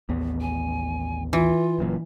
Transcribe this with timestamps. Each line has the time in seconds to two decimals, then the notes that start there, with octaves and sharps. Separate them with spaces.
0.09 A1 D#2 B3
0.41 G#5
1.33 E3 F4
1.79 F#1 F#2 A#2